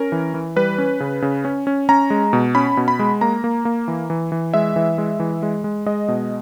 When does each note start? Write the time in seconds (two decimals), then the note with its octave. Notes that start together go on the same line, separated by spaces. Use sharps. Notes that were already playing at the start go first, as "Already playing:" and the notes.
Already playing: C#4 A#4
0.12 E3
0.34 E3
0.56 G3 B4
0.78 C#4
1.00 C#3
1.22 C#3
1.45 C#4
1.67 C#4
1.89 C#4 A#5
2.10 G#3
2.33 B2
2.55 C#4 B5
2.77 B2
2.88 B5
2.99 G#3
3.21 A#3 A#5
3.44 A#3
3.65 A#3
3.88 E3
4.10 E3
4.32 E3
4.54 G#3 E5
4.76 E3
4.98 G#3
5.20 E3
5.43 G#3
5.64 G#3
5.86 G#3 D#5
6.08 B2